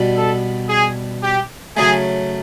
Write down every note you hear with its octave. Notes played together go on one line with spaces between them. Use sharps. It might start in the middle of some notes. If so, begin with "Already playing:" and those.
Already playing: B2 G3 B3 D4 F#4
A4
G#4
G4
C#3 F#3 A3 G#4